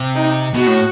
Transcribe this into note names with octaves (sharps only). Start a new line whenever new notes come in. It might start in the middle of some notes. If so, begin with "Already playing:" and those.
Already playing: C3
D#4
B2 F#4
A2